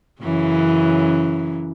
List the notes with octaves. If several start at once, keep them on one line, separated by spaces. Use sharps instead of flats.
F#2 C#3 E3